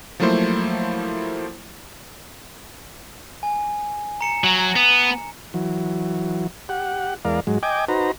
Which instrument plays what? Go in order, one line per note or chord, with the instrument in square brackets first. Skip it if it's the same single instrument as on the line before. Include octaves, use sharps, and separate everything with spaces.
[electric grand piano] F3 F#3 A3 A#3 E4 C5
[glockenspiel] G#5
A#5 C#7 E7
[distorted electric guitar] F#3
B3
[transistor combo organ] E3 F#3
G4 F#5
E2 G#3 A#4 D5 F5
G#2 F#3 G#3
D#5 G5 G#5 D6
D#4 F#4 B4 C5 A#5